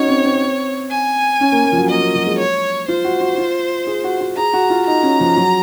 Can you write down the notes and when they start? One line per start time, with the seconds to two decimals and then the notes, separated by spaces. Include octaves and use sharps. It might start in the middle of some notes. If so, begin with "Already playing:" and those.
Already playing: C#4 D#4 F#4 C#5
0.09 C4
0.25 C4
0.91 G#5
1.41 C#4
1.52 A#3
1.65 A#3
1.72 F3
1.77 F#3
1.89 A#3 D#5
2.01 A#3
2.15 F#3
2.26 G#3
2.39 C#5
2.88 F4 C5
3.04 F#4
3.21 F#4
3.35 F#4
3.38 F4
3.87 G#4
4.04 F#4
4.21 F#4
4.37 G#4 A#5
4.53 F#4
4.70 F4
4.87 D#4 A#5
5.03 C#4
5.20 F3
5.37 F#3